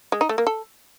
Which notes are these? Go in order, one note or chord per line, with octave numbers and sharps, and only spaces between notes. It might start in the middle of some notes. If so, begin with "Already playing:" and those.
G#3
D#4
A3
A#3
A4